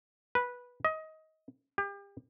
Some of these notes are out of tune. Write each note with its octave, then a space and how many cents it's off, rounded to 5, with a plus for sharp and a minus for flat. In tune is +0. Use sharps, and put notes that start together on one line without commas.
B4 -10
D#5 +20
G4 +35